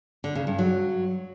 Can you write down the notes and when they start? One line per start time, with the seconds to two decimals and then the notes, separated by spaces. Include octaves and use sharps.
0.24 D3
0.35 C#3
0.47 G2
0.59 F#3